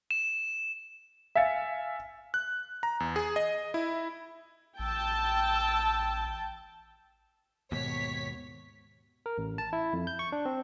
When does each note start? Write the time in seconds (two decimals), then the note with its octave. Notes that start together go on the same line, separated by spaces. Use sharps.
0.11 E7
1.35 E5 F5 G#5 A6 C#7
2.34 F#6
2.83 A#5
3.00 E2
3.16 G#4
3.36 D#5
3.74 E4
4.79 A1 G5 A5 E6
7.72 D#2 G#2 B2 C#5 B6
9.26 A#4
9.38 A1
9.58 A5
9.73 E4
9.93 F2
10.07 G6
10.19 C#6
10.32 D4
10.46 C4